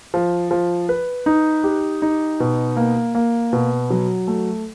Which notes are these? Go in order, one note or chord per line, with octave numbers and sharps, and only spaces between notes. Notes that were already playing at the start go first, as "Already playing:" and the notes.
F3
F3
B4
D#4
G4
D#4
B2
A#3
A#3
B2
F#3
A3